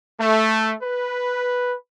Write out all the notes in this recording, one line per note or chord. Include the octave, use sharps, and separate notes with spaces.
A3
B4